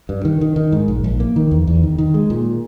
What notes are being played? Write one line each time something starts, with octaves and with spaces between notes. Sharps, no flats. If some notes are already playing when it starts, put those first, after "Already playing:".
G2
D#3
D#3
D#3
G#2
A#1
A#1
A#3
D#3
E2
E2
D#3
D#3
G#3
A#2